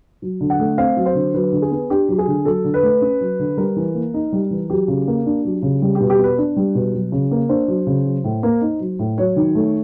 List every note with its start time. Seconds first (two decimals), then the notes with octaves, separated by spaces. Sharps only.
0.22 F#3
0.41 D3
0.50 F#5
0.59 A3
0.78 C4 F5
0.97 F#3
1.06 C5
1.15 D3
1.34 F#3 B4
1.52 D3
1.62 G#4
1.71 B3
1.90 D4 G4
2.09 F#3
2.18 G#4
2.28 D3
2.45 F#3 A4
2.64 D3
2.74 B4
2.83 A3
3.02 C#4
3.21 F#3
3.39 D3
3.57 G3 A#4
3.76 E3
3.95 A#3
4.14 D#4
4.32 G3
4.51 E3
4.70 F#3 G4
4.88 C#3
5.08 A#3
5.26 D4
5.45 F#3
5.62 C#3
5.82 G3
5.95 G4
6.00 B2
6.10 G4
6.19 B3
6.24 B4
6.38 D4
6.56 G3
6.75 B2
6.93 F#3
7.12 C#3
7.31 A#3
7.49 D4 C5
7.68 F#3
7.87 C#3
8.05 F#3
8.24 A2
8.43 A#3
8.61 D#4
8.80 F#3
8.99 A2
9.18 F#3 C#5
9.36 D#3
9.55 A3